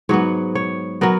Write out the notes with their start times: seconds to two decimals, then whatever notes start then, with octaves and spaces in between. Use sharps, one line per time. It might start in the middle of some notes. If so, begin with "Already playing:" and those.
0.09 G#2 F#3 B3 C#5
0.55 C#5
1.01 F#3 B3 A#4